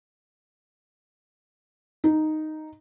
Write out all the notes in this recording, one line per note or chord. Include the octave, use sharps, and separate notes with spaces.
D#4